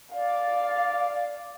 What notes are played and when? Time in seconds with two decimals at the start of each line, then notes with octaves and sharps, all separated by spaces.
0.14 D5 F5